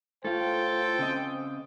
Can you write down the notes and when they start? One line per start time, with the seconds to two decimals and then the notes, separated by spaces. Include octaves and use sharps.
0.25 A2 F4 A4 C5 G5
0.99 C#3 C4 D#5